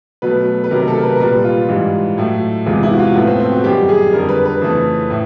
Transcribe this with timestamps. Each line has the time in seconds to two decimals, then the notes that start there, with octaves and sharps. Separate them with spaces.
0.22 B2 F#3 A3 B4
0.64 B4
0.71 C3 D#3 F#3 A3 A#4
0.88 A4
0.98 A#4
1.03 B4
1.16 A#4
1.20 A#2 G3 B4
1.44 F4
1.69 G#2 E3 G3
2.18 A2 F#3 A3
2.66 E2 C3 E3 G#3 F4
2.83 E4
2.92 F#4
2.99 F4
3.15 A2 F3 A3 B3
3.27 C4
3.40 C4
3.52 F#4
3.64 F#2 D#3 G3 G4
3.89 G#4
4.13 F2 D3 G3 A#4
4.29 B4
4.46 B4
4.62 F2 C#3 E3 A3
5.10 A2